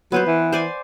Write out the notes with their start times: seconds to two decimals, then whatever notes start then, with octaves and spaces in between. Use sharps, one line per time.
0.12 F#3 B3 B4 C5
0.26 E3
0.53 C5 D5 G#5